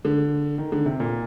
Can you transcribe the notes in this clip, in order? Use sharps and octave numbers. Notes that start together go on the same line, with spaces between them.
D3
D#3
D3
C3
A#2